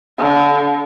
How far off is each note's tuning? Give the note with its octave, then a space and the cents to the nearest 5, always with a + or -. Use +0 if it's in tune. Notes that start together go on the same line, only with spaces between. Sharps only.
D3 -30